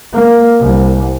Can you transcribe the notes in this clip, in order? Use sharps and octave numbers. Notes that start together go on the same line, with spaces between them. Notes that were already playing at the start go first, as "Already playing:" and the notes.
A#3
C2